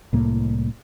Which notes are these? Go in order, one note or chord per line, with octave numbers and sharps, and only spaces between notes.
C2 A2 A#3